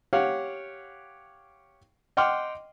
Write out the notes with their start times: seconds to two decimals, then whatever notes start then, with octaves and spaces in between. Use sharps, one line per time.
0.13 G4 C#5 F5 F#5
2.17 D#5 F#5 G5 C6 D6 F6